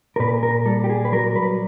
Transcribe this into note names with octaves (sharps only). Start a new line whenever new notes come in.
A#4
A#2 B4
A#4
G3 A4
G4
G#4
B4
F#3 A#4
B4